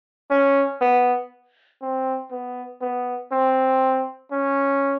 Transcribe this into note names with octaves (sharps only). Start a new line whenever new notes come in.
C#4
B3
C4
B3
B3
C4
C#4